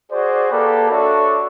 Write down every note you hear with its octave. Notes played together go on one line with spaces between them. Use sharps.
F#4 G#4 C5 D5
A#3 G4 A4 B4 D5 A5
D4 F#4 A4 C#5 D5 E5